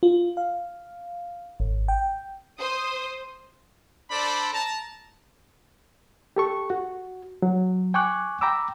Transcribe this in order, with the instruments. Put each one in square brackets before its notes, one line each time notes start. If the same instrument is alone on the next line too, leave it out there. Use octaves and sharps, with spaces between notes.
[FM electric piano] F4
F5
G#1
G5
[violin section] C5 D#6
[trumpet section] D4 A4 C5 D5 B5
A5 A#5
[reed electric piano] G4 A4 C#6
F#4
F#3
G5 G#5 C#6 D6 F#6
G5 A#5 B5 D6 E6